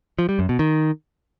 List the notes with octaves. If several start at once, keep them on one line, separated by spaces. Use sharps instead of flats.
F3
G3
F#2
B2
D#3